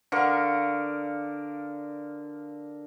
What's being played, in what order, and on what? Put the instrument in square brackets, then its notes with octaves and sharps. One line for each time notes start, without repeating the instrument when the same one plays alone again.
[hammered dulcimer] D3 A#4 F5 C#6